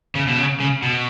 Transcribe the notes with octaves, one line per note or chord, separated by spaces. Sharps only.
C#3
B2
C#3
C#3
B2